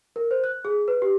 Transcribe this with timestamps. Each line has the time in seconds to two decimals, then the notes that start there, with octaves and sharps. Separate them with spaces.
0.16 A#4
0.31 C5
0.44 F#6
0.65 G#4
0.88 B4
1.02 G4